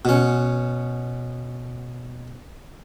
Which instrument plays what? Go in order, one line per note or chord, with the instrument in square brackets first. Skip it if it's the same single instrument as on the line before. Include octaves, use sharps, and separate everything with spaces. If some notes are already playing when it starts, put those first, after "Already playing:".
[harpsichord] B2 C#4